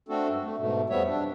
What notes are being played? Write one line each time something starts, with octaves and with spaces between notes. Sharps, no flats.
A3 C4 D4 F#4 A4
G2
A3
G#2 B2 A3
F2 F3 G3 B3 C#5 E5
D4